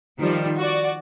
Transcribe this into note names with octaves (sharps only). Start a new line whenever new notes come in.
D#3 F3 G3
F#4 D5